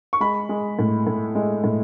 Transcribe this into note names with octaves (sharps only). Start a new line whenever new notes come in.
C#6
G#3 B5
G#3
A2
A2
G#3
A2